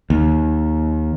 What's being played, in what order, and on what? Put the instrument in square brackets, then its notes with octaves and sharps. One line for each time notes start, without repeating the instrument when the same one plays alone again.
[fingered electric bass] D#2